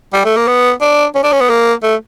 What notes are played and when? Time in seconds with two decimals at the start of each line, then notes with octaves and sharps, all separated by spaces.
0.13 G3
0.25 A3
0.36 A#3
0.48 B3
0.81 D4
1.15 C#4
1.24 D4
1.32 C#4
1.41 B3
1.50 A#3
1.83 A3